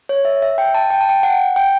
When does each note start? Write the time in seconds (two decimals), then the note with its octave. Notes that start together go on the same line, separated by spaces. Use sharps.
0.09 C#5
0.25 E5
0.42 E5
0.58 G5
0.75 A5
0.90 G5
1.01 A5
1.09 G5
1.23 F#5
1.56 G5